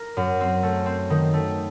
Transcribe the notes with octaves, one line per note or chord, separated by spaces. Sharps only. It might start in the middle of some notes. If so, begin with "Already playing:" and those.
Already playing: A#4
F#2
C4
A3
C4
D#3
A3